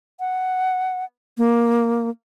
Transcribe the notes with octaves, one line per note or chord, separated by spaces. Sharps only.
F#5
A#3